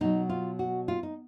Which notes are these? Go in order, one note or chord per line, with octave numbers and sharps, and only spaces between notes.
B2 F#3 D#4
F4
F#4
F4
D#4